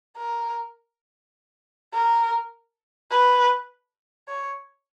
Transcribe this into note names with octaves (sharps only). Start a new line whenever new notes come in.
A#4
A#4
B4
C#5